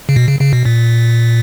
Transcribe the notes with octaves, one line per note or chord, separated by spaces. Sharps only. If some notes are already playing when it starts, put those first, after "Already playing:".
C#3
B2
C#3
C#3
B2
A#2